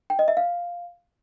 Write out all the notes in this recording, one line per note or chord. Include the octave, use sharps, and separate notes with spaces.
G5
D#5
E5
F5